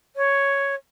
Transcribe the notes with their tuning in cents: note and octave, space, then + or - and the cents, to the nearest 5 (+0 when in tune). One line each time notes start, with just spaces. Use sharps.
C#5 +0